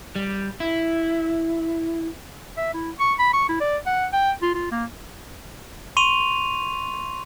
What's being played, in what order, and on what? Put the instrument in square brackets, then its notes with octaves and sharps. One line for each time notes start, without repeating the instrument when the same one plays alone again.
[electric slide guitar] G3
E4
[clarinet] E5
E4
C#6
B5
C#6
E4
D5
F#5
G5
F4
F4
A#3
[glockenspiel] C6 C#6 D#7 F7